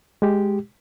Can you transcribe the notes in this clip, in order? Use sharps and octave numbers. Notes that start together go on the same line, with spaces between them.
G#3 G4